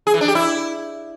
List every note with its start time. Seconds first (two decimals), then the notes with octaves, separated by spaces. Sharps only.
0.07 G#4
0.14 E3
0.21 D4
0.28 G4
0.35 E4